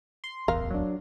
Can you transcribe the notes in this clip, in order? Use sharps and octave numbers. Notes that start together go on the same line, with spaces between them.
C6
D1 A1 E2 A#4 F5
F#3 D4